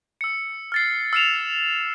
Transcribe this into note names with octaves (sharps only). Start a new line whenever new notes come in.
E6 C#7
F6 A6 C7
E6 F6 C7 C#7 E7 F7